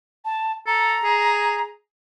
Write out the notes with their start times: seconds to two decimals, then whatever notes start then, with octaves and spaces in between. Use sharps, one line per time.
0.25 A5
0.67 A4 A#5
1.04 G#4